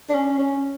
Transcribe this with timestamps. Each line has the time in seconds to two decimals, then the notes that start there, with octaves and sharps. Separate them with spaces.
0.09 D4
0.14 C#4
0.38 C#4